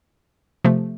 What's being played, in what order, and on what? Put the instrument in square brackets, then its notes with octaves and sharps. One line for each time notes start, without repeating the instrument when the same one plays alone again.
[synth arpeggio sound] C3 F3 A3